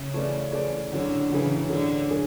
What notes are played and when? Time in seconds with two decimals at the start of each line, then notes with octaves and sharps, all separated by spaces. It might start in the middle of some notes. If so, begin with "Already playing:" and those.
Already playing: C#3
0.13 E3 A3 C#4 G#4 D5
0.52 E3 A3 C#4 G#4 D5
0.91 A2 D3 F#3 C#4 G#4
1.30 A2 C#3 E3 F#3 C#4 G#4
1.69 A2 D3 F#3 C#4 G#4
2.08 A2 F#3 C#4 G#4